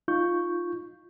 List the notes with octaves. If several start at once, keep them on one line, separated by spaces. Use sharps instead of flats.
D#4 F4 C#6 G6